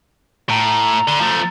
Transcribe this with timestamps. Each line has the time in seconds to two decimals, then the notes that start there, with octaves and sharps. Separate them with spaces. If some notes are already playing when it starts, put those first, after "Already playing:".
0.49 A2 A#5
1.08 D3
1.21 F3 A3